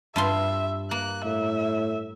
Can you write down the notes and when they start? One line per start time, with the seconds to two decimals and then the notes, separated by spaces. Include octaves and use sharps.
0.16 G2 F4 E5 C6
0.91 A#3 F#6
1.25 A2 E5